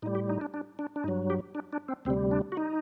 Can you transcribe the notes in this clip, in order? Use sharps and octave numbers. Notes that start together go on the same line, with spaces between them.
A2 G3 D#4
G4
D#4
D4
D4
D4
D4
G2 F#3 D#4
G4
D4
D4
C4
D2 C3 G3 C4
D4
F#4
D#4